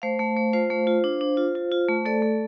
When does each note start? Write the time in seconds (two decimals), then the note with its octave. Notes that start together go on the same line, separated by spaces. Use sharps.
0.02 A3 C5 F5
0.19 A3
0.37 A3
0.53 F4 C5 F5
0.70 A3
0.87 F4
1.04 D4
1.21 D4
1.37 F4
1.55 F4
1.72 F4
1.88 A3
2.05 A3 A4 D5
2.22 A3